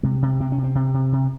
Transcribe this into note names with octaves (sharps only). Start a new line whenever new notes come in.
C3 G#3
C3
C3 C4
C#4
C3
C4
C3
C3
C3